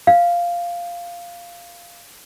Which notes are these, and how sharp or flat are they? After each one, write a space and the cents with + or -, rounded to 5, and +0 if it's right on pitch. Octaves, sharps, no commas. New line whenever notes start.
F5 -5